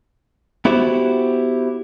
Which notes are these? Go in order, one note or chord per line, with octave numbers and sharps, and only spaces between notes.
B3 E4 F#4 G4 C5